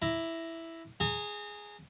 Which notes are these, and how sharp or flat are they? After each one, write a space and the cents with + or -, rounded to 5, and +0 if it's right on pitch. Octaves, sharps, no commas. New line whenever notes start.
E4 +0 A#5 +0 D6 +0
G#4 +0 A#5 -35 C#6 -30